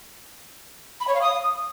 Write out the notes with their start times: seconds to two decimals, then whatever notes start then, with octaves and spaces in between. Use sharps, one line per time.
1.00 B5
1.07 C#5
1.15 F5
1.22 D#6